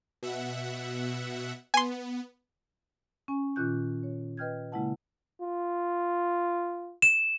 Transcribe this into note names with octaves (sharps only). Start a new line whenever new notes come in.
B2 E5 F#5
B3 G#5 C6
C#4 G#5
A#2 D#3 C#4 F4 F#6 G6
C#5
B4 D#5 G5 F6 G6 G#6
C#3 G#3 A#3 E4 F#5 A5
F4
E7